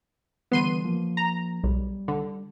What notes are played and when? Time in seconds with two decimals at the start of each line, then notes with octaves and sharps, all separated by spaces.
0.51 D3 E3 G3 B3 C6 D#7
0.84 F3 A#3
1.17 A#5
1.64 B1 G3
2.08 D3